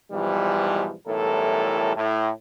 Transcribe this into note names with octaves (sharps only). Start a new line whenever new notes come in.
G#2 B2 E3 F3 G3
B1 A2 E3 G3 A4 A#4
A2